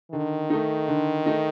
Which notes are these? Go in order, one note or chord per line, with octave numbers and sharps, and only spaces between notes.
D3 D#3
A3 D#4
D3
A3 D#4